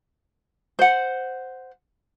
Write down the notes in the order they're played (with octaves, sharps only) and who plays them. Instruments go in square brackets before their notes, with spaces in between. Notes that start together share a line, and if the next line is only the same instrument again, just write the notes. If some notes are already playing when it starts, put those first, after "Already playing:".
[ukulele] C5 F#5